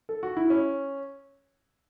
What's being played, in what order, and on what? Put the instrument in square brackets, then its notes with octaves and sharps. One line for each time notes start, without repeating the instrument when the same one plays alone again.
[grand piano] A4
F#4
E4
C#4